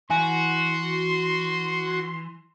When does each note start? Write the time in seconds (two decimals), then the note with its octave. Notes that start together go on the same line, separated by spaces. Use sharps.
0.10 E3 F#4 G#5 C6